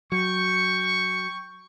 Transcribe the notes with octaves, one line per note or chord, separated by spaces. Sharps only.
F#3 G5 C#6